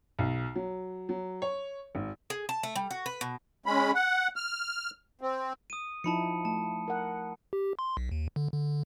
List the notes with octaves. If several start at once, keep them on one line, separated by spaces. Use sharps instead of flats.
B1
F#3
F#3
C#5
G#1
G#4
A5
A3
G3
F#4
B4
B2
G#3 C#4 B5
F#5
F6
C4
D#6 D#7
F3 D#4 E4 A5 B5 C#7
A3 A5
A#4 F#5
G4
C6
B1
D#2
D3
D3